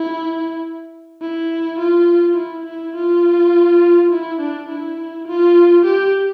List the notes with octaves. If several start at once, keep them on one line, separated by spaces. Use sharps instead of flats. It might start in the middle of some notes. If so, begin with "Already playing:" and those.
Already playing: E4
E4
F4
E4
E4
F4
E4
D4
E4
F4
G4